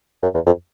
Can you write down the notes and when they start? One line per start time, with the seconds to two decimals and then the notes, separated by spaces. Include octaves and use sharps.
0.22 F#2
0.34 E2
0.46 F2